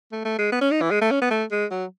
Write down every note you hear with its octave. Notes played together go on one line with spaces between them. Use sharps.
A3
A3
G#3
B3
C#4
D#4
E3
G#3
A3
C#4
B3
A3
G#3
F#3